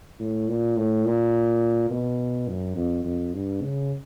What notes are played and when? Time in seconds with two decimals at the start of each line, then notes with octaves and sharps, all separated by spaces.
0.19 A2
0.48 A#2
0.77 A2
1.05 A#2
1.90 B2
2.48 F#2
2.76 F2
3.05 F2
3.34 G2
3.62 C#3